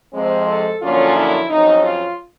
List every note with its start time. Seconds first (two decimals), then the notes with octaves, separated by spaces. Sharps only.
0.13 F2 C3 F3 G#3 C4
0.46 A4
0.81 F#2 D3 F3 A#3 C#4 F4
1.15 E4
1.50 F2 C#3 F#3 D#4
1.84 F4